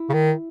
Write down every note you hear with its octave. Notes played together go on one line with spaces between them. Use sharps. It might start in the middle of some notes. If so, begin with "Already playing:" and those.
Already playing: E4
C#3
D#3